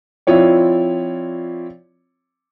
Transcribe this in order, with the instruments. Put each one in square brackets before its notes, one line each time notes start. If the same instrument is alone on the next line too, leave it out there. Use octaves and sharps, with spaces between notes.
[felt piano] F3 C4 E4 F4 C#5 D5